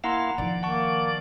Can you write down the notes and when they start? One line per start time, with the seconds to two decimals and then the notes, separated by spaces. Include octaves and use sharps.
0.04 A#3 E4 F5 F#5 A#5 C6
0.38 D#3 F3 D5
0.63 A#3 F#5 A5 C#6